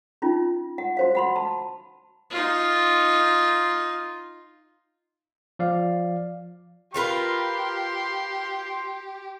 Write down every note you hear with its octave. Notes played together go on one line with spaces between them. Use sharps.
C#4 D#4 F4
F#5
F#4 C5 F5
F#5 B5 C6
A5
D#4 F4
F3 D5 F5
F4 G4 A#4 B4 C6